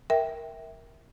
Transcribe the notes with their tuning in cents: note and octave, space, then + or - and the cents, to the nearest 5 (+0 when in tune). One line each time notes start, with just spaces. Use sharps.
A#4 +0 E5 -15 G5 +0